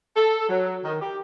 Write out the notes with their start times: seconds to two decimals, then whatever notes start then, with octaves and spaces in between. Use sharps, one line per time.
0.17 A4
0.49 F#3
0.85 D#3
1.02 G4